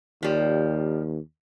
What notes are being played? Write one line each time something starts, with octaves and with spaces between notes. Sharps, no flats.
D#2 F3 G3